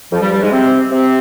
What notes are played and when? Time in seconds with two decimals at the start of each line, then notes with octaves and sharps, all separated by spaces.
0.11 F2 F3
0.21 G2 G3
0.31 G2 G3
0.41 G#2 G#3
0.51 C3 C4
0.92 C3 C4